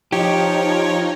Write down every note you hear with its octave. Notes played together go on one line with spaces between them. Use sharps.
F3 D#4 G4 C#5